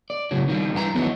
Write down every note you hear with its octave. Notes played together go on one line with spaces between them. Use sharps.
D5
A2 C#3 F#3
D#3 F3 G3
G2 E3 G4 A#5
D#3 E3 F#3 A3 B3